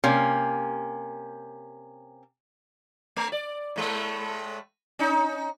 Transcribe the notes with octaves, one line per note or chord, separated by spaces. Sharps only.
C3 A#3 C#4
A3
D5
A2 G#3 A3
C#4 D#4